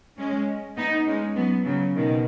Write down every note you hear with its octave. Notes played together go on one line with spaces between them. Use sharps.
G#3 C#4
B3 D#4
G#3 C#4
F#3 B3
C#3 F#3
B2 D#3